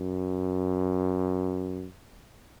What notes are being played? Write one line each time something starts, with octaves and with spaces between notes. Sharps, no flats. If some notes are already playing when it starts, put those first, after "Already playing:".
Already playing: F#2